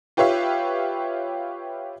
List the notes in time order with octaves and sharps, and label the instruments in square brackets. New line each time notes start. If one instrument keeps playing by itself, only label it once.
[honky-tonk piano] F4 G4 B4 C#5 E5 F5